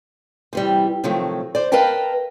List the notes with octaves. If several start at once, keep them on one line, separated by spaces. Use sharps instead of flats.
C3 E3 G3
C3 D#3 F3 F#3 A3
C5 D5
A#4 B4 D#5 F5 G5 A5